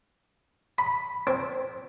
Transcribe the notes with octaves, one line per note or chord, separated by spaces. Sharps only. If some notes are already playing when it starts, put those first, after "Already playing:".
B5
C4